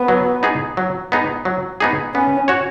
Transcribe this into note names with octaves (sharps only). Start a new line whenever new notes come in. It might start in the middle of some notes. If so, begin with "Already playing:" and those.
Already playing: B3
F#3
B3 D#4 G#4
F#3
B3 D#4 G#4
F#3
B3 D#4 G#4
B3 C#4
F#4 C#5